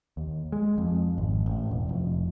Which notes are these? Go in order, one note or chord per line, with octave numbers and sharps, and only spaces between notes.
D#2
G#3
F2
G#1
A1
E1
F1